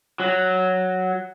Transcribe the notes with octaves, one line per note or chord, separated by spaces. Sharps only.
F#3